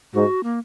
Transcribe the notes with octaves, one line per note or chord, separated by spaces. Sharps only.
G#2 F#4
A#3